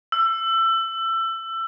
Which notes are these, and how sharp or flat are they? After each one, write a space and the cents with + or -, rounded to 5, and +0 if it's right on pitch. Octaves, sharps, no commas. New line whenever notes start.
E6 +25